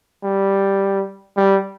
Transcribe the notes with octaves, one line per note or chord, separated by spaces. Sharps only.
G3
G3